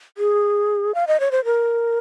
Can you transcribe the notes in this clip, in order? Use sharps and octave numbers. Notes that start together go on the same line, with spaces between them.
G#4
F5
D#5
C#5
C5
A#4